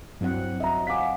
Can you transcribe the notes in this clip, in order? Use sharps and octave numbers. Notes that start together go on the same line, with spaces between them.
G2 F#3 C4 E4 F#5
D#5 E5 A#5
F5 F#5 G#5 D6 B6